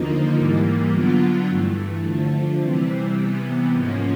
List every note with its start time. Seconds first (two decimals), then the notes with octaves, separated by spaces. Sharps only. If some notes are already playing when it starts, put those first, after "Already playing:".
Already playing: D#2 D3 F3 A#3 D#4
0.36 G#2 E3 G3 A#3
0.92 D3 F#3 B3 D4 F4
1.48 G2 E3 A3
2.04 D3 F3 A3
2.60 C3 E3 G3 C4
3.16 C3 E3 G3 B3
3.73 G#2 F3 A#3 C#4